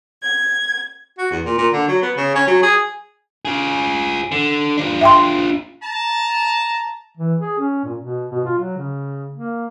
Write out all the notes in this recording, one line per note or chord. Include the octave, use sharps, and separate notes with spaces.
G#6
F#4
E2
A#2
A#2
D3
F#3
B3
C#3
C#4
F#3
G#4
F4 G#4
D3
D4 F4
E5 G5 C6
A5 A#5
E3
G#4
C#4
A#2
B2
B2
F4
F#3
C#3
A#3